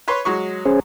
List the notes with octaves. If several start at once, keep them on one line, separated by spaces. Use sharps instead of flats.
B4 C#5 C6
F#3 G#3 C#6
C#4 G#4 C5